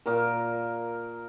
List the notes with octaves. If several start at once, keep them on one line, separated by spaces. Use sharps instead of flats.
A#2 A#4